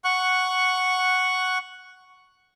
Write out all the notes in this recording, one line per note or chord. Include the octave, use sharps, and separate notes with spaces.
F#5 C#6 F#6